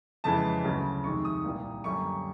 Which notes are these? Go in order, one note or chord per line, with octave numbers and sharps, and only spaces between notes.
F2 C#3 E3 G#3 A5
D2 C#3 F#3
F2 C3 D#3 G#3 C#6
D#6
C2 A#2 G3 A#3
F#2 D3 G3 A#3 C#6